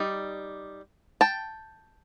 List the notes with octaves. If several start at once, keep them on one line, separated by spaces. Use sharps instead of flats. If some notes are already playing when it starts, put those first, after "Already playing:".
Already playing: G3 D#4
G5 A5